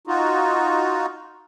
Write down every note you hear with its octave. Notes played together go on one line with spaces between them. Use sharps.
D#4 F4 F#4